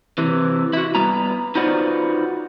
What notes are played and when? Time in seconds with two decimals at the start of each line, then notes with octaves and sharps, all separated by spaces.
0.18 C3 E3
0.73 E4 F#4
0.95 G3 B3 A#5
1.55 D#4 F4 F#4 B4 C5 D5